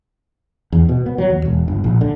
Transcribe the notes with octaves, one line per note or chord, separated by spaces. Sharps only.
E2
B2
B3
F#3
D#2
E1
G1
A#1
D3